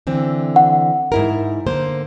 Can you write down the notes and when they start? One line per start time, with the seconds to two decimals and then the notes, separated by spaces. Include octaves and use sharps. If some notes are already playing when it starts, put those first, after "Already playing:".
0.07 D3 E3 C4
0.56 F#5
1.12 G#2 E4 A#4
1.66 D3 A#3 C5